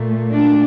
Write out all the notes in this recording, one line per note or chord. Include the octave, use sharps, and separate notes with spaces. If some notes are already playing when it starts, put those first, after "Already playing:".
Already playing: A#2 A3
D4